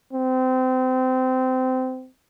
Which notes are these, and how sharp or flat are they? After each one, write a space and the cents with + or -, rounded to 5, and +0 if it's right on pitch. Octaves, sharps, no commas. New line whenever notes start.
C4 -25